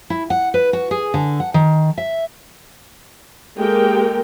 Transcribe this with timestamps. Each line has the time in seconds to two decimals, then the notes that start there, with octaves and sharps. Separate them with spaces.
0.10 E4
0.30 F#5
0.54 B4
0.73 F#4
0.91 G#4
1.14 D3
1.40 F#5
1.54 D#3
1.98 E5
3.58 G#3 A#3 G4 A4 A#4 G5